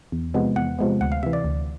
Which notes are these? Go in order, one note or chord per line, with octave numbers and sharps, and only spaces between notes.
E2
C3 F3 G#3 B3
E2 F#5
C3 F3 G#3 B3
D2 F#5
F5
C3 E3 E5
D5
D2